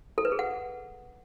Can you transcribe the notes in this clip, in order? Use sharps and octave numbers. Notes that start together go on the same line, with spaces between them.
A4
B4
G#4
F#5